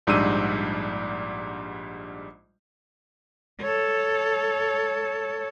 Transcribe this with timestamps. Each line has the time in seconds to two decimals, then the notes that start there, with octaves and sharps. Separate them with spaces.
0.07 A#1 G#2 G3 D4 E6 D#7
3.60 A4 C#5